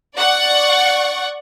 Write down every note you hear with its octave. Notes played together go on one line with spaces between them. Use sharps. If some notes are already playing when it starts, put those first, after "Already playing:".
D5 F#5 C#6